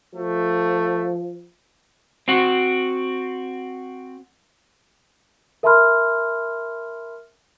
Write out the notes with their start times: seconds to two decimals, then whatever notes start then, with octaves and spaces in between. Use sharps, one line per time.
0.15 F3 A3
2.28 C4 F#4
5.63 A#4 E5 A5 B5 C6 F6